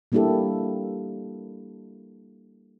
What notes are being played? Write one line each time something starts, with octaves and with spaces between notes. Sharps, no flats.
G3 A#3 D4 E4 G4 A4